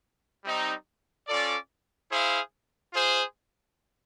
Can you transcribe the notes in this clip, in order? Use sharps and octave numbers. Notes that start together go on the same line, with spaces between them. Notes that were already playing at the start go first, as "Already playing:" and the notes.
G3 C4 D#4
C#4 F4 A4 D5
E4 G#4 C5 F5
F4 G#4 C5